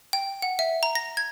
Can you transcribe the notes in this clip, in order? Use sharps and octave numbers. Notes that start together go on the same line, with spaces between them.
G5
F#5
E5
A#5
A#6
G#6